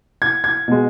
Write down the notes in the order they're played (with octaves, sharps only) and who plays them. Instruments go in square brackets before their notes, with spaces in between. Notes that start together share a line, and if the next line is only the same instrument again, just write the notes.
[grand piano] G#6
G#6
B2 G#3